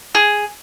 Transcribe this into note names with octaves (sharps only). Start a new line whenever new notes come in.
G#4